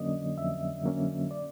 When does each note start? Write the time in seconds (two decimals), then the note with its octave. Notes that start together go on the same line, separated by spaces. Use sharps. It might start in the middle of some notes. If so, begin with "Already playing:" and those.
Already playing: F2 D3 F#3 A#3 C#4 D5 D#5
0.37 F2 E5
0.83 D3 F#3 A#3 C#4
1.31 D5